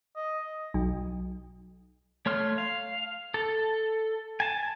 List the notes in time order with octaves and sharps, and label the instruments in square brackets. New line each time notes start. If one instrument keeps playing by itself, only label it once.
[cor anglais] D#5
[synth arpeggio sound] B1
[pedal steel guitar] A3 C#5 C6 F6
F5
A4
G#5 A5